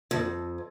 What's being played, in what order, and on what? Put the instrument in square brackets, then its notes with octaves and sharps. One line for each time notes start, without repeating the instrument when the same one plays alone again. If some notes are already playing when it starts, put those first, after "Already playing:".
[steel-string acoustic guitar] F2